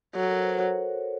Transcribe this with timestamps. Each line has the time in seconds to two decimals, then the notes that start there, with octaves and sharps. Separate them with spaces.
0.15 F#3 A4
0.28 A#4
0.41 C5
0.54 C#5